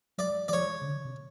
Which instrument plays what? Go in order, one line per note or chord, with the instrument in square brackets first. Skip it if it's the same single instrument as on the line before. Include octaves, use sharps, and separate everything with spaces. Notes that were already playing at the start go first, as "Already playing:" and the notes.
[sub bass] F#3 [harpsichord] D5
[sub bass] E3 [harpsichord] D5
[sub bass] F3 [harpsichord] C#5
[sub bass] C#3
D3
C3